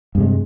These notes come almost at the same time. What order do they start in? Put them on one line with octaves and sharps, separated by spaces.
G2 C3 G#3